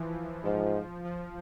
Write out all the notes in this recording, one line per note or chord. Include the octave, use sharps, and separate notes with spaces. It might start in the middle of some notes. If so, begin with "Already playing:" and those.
Already playing: E3 F3
G#2 F3
F3